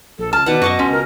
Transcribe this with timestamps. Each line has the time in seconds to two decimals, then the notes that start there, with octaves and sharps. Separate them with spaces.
0.19 A#1 A4
0.33 C#2 A5 F6
0.46 B2 D#3 B4 D5 F#5
0.62 F#2 F#4 D#5 A5 C#6
0.79 C#2 C#4 C6
0.91 A#4